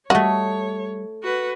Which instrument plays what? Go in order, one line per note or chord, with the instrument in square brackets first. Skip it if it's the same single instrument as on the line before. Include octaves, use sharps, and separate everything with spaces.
[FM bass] G3 [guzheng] A3 D#5 [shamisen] F#4 [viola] C#5
[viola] F#4 B4